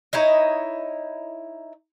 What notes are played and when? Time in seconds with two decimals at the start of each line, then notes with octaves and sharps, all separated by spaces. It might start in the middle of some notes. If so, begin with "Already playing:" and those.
0.13 D#4 E4 C#5 D#5